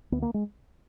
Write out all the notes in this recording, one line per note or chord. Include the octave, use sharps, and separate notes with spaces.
D2 B3
A#3
G#3